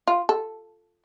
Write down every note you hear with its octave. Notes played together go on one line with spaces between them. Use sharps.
F4
A4